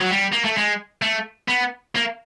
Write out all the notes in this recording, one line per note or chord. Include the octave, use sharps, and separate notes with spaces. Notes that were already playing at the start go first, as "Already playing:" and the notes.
F#3
G3
A#3
A3
G#3
A3
B3
A#3